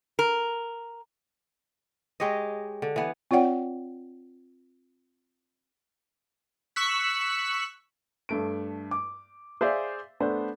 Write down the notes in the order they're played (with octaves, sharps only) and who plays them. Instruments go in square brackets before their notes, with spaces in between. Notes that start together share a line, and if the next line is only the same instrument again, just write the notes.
[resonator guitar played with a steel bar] A#4
[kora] G#3 G4 C#5 D#5
D3
E3 B3
[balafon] C4 F4 C#5 D5 F#5 G5
[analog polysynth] C#6 E6 F#6 B6
[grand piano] G2 A3 D7
D6
G#4 C5 D5 E5 F5
A3 B3 D4 C5